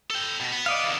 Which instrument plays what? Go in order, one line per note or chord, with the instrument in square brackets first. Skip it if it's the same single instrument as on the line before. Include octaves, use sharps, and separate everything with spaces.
[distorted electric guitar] A4 G5
B2
B3
[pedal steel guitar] D5 D#5 F5
[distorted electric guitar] E2 D3